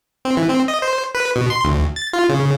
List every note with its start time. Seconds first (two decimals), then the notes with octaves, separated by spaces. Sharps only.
0.25 C4
0.37 E3
0.49 C4
0.68 D#5
0.82 C5
1.15 B4
1.36 B2
1.50 C6
1.64 D2
1.96 A6
2.13 F4
2.29 C#3